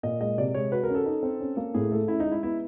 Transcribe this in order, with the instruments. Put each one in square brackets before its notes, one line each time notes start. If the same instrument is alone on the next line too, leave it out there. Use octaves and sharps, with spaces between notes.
[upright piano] A#2 [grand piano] D#5
[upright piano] G#3 [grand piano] D#5
[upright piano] C3 [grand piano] D5
[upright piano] G#3 [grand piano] C#5
[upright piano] F#4 [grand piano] B4
[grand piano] A#4
[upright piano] C#4
[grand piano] A4
[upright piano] D#4
C4
C#4
A#3
[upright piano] A2 [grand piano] G#4
[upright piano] A3 [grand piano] A4
[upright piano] C#4 [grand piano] E4
[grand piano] D#4
[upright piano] G#3
[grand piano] E4
[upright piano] B3 [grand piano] E4